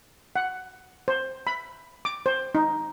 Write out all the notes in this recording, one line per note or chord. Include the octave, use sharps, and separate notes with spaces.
F#5
C5
B5
D6
C5
D#4